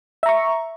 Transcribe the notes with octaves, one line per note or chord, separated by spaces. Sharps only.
E5 A#5 C#6